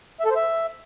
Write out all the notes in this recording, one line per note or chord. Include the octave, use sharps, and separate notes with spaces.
E5
A4
C5
E5